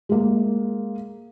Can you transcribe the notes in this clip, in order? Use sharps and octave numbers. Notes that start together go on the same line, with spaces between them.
G#3 A#3